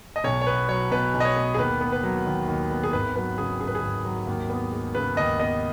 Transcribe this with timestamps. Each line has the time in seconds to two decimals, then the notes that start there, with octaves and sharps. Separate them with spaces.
0.16 D#5
0.24 B1 C#5
0.41 C#5
0.47 B3 B4
0.69 F#3 C#5
0.91 B2 B4
1.14 B1
1.20 D#5
1.25 C#5
1.36 B3
1.54 G#4
1.58 D#2 B4
1.81 B3
1.92 B4
2.03 F#3
2.26 D#3
2.48 D#2
2.71 B3
2.83 G#4
2.93 G#1 B4
3.16 F#3 B4
3.38 C#3 G#4
3.60 F#2 G#4
3.68 B4
3.75 G#4
3.83 G#1
4.05 F#3
4.27 D#2
4.50 B3
4.72 G#3
4.95 C#3 B4
5.17 D#2 D#5
5.39 B3 D#5